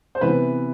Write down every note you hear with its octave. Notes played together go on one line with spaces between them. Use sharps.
C5
C3 E3 B3 B4